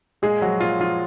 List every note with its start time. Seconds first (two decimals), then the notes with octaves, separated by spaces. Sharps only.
0.22 A#2 G#3 G#4
0.41 F3 F#3 F#4
0.60 A#2 F4
0.80 F3 F4